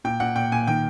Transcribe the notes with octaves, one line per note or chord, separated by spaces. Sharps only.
A#2 G5
A#2 F#5
A#2 G5
A#2 G#5
D#3 G5